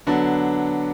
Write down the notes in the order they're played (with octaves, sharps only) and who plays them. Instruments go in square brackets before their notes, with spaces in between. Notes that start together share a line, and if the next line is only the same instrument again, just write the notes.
[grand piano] D3 F#3 B3 D4